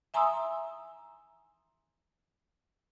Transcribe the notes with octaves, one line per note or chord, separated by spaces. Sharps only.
E5 G#5 A#5 C6 D#6 E6